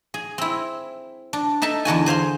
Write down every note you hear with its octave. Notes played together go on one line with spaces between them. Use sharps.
G#4
C4 E4
D4
D#4 A4 E5 A5
E2 D3 F#4 G#5
G#4 C5 F5 C6